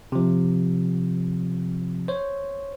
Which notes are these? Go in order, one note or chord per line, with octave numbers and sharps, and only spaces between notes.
C3 F3
C5 C#5